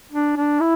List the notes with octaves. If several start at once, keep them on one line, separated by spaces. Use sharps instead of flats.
D4
D4
E4